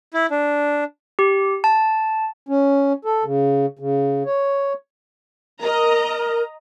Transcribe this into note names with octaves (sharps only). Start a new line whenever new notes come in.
E4
D4
G4
A5
C#4
A4
C#3
C#3
C#5
A#4 D#5 A#5